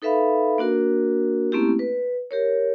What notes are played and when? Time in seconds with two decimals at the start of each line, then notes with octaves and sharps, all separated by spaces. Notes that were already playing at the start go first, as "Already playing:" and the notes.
0.02 D#4 A4 B4 E5 F5 B5
0.58 A#3 D4 F#4 A#4
1.52 A3 A#3 C4 C#4 E4 G4
1.79 B4
2.31 G4 A#4 C#5